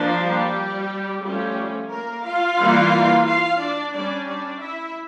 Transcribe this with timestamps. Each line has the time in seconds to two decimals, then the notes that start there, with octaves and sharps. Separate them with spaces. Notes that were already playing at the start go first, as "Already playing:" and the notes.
Already playing: F3 A#3 D4
0.23 G3 G4
1.24 F3 G3 A3 C#4 G4
1.91 A#3 A#4
2.25 F4 F5
2.59 E3 G3 A#3
3.27 F4 F5
3.60 D4 D5
3.94 G3 C#4 D4 D5
4.28 D4 D5
4.61 E4 E5